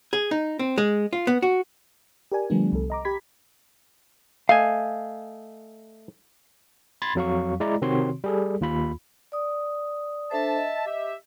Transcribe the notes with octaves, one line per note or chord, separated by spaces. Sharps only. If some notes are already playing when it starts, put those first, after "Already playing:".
G#4
D#4
C4
G#3
F4
B3
F#4
G4 A#4 D5 G#5
D3 F3 G3 A3 B3 D4
C2 A4
D#5 A#5 D6
G4 B5 G#6 B6
A3 D#5 F5 G#5
B5 C6 G#6 A6
F2 F#3 F5 C#6
G#3 E4 D5 A#5
C3 D#3 C4 F#4 C#5 C6
G3 G#4 A4
D#2 F4 B5
D5 D#6
D4 A4 C5 E5 A5
D#5
G4 E5